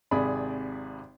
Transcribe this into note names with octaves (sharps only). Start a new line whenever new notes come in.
G#1 C3 G#4 D5 B5